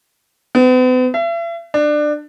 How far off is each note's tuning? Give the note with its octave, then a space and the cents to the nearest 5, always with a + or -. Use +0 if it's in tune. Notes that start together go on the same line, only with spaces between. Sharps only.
B3 +45
E5 +40
D4 +20